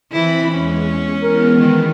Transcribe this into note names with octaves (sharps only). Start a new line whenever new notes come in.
E3 C4 E4 B5
E2 G#3 C#4
E3 G#3 B3 A#4
D#3